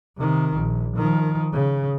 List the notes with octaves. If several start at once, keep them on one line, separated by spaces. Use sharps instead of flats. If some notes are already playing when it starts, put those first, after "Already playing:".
C3 D#3
A#1
D#3 F3
C#3